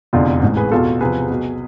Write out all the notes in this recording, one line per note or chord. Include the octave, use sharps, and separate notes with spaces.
F1 E2 D3 D4 F4
A1 G#2 E3
G#4 B4
E2 B2 F4 A4
E2 C3 F3 G#4 B4
B1 B2